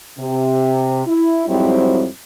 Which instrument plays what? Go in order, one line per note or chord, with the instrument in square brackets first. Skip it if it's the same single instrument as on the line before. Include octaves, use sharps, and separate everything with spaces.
[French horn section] C3
E4
F2 G#2 F#3 G3 C4 E4